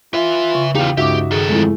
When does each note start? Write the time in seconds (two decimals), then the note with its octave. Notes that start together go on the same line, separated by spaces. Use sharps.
0.14 F4 B4 E5
0.55 C#3 C#6
0.75 E2 D#4 F4 G4 F5
0.97 C#2 G2 D#4 F#4 G4 E5 D6
1.31 D#3 G#4 A4
1.49 F2 G#3 A3 E4